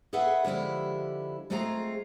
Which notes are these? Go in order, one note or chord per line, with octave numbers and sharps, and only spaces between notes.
G#4 A4 B4 E5 F#5
D3 F3 G#3 E4 G4
G#3 A3 C4 F4 G#4 A#5